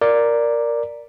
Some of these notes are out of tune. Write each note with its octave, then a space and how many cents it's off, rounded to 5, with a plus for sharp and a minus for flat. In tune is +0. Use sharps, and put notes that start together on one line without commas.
A#4 +0 D5 +0